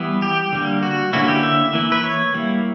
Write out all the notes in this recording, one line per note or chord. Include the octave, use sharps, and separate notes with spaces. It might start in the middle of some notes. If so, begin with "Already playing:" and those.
Already playing: E3 G3 B3 E4
G4
D3 G3 A#3
F#4
D3 A#3 C#4 E4 F#4
G4
E5
E3 A#3 E4
B4
C#5
G3 A#3 E4